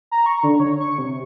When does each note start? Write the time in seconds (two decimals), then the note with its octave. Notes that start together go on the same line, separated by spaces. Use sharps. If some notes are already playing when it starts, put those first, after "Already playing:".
0.11 A#5
0.26 C#6
0.43 D3
0.60 C#5
0.80 C#6
0.98 C3